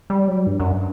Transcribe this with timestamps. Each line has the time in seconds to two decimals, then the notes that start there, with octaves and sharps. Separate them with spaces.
0.10 G3
0.28 F#3
0.47 G2
0.60 F#2